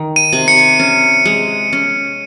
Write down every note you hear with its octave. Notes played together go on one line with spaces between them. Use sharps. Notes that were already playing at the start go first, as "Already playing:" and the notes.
Already playing: D#3
D#7
C3
C#7
C#4
G#3
C#4